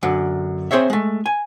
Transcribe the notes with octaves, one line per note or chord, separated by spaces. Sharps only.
F#2 D3
C4 G#4 C5 C#5 E5
G#3 A3
G#5